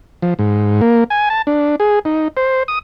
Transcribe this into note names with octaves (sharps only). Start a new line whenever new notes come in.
F3
G#2
A#3
G#5
A5
D4
G#4
D#4
C5
D#6